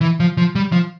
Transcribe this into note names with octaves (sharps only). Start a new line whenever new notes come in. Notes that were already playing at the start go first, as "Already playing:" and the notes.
E3
F3
F3
G3
F3